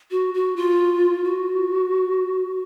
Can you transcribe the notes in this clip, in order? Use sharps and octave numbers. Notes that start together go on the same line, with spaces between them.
F#4
F#4
F4
F#4